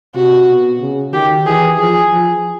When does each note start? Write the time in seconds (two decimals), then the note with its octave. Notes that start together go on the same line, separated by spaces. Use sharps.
0.15 C3 F#4
0.48 B2
0.81 C#3
1.13 D#3 G4
1.46 E3 G#4
1.79 F3 G#4
2.12 F3